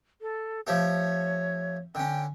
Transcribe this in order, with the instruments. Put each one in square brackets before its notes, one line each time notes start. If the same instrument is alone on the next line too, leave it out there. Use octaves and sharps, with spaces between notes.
[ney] A4
[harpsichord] F3 A3 G4 [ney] C#5
[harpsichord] D3 C#4 [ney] G5